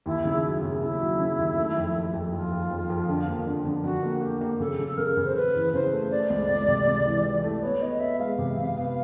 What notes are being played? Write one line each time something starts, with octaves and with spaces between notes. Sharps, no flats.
D#2 E4
C#3
F#3
C#3
C#3 E4
F#3
C#3
D#2
A3
F2
F2
F2
F2 F4
F2
F2
F2
D3
A#3
D3
D3
D3 F#4
A#3
A#3 G4
A#3
C#3 A4
C#3
C#3 A#4
C#3
C5
C#3 B4
E3
C#3 C5
A3
A3 D5
C#2
C#2
C3
C#2
E3
E3
A3
B3 C#5
B3 D#5
B3 E5
G#3 F5
C3
C3
B3